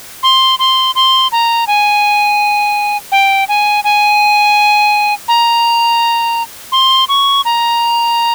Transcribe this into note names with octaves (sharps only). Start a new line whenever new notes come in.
C6
C6
C6
A#5
G#5
G5
G#5
G#5
A#5
C6
C#6
A#5